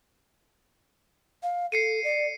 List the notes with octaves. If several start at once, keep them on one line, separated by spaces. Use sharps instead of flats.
F5
A4 C7 C#7 D#7
D5